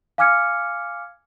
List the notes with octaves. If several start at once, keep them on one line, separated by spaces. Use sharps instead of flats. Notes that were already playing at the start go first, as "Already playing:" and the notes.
F5 G#5 D6 F6 G#6 C#7